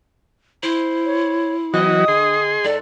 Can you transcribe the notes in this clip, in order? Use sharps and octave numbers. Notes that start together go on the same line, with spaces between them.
E4 C5
C#5
E3 F#3 B3 F#4 D#5 D#6
D3 G#4 C6
G#2 A4 D5